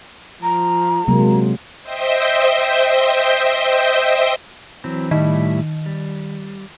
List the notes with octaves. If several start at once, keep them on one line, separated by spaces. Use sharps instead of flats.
F3 A#5
C3 F#3 G#3 A#3
C5 D#5 E5 G5
E3 F#3 C4
A2 D#3 G3 E4
G3